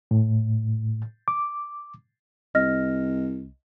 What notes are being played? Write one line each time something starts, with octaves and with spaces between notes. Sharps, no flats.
A2
D6
C2 D#5 F6 A#6